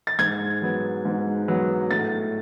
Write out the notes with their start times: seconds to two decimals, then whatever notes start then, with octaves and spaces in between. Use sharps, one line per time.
0.07 A6
0.19 G#2 G#6
0.62 F#3 B3
1.05 G#2
1.48 F#3 B3
1.91 A2 A6